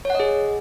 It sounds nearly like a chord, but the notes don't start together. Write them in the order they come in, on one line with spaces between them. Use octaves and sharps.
C#5 F#5 D#5 G#4